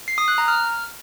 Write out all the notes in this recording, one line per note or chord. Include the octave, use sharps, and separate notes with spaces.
C7
D#6
F#6
A#5
F6